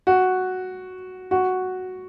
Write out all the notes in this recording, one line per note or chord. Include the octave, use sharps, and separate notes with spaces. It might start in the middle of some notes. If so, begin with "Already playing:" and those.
F#4
F#4